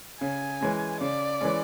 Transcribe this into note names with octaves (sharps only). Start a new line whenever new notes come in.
C#3 G#5
E3 G#3 C#4
C#3 D5
E3 G#3 C#4